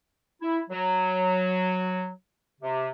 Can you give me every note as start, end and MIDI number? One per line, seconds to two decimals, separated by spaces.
0.41 0.59 64
0.70 2.08 54
2.61 2.89 48